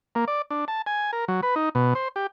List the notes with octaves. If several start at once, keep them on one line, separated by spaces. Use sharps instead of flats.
A#3
D5
D4
A5
G#5
A#4
F#3
B4
D#4
B2
C5
G4